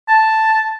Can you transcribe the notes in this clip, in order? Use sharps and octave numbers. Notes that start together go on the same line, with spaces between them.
A5